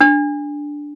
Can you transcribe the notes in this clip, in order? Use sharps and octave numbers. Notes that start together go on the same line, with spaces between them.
D4